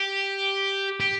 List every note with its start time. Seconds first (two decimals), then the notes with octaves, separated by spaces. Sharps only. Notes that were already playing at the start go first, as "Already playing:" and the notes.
Already playing: G4
1.00 G4